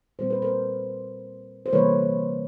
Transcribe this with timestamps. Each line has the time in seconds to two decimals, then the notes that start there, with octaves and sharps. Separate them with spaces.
0.19 A#2 G3 C4 C5
0.30 B4
0.42 A#4 C5
1.66 C5
1.72 C3 E3 G3 A#3 B4 C#5